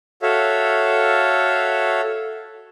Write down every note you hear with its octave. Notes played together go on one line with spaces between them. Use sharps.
F#4 A4 C#5 E5 F5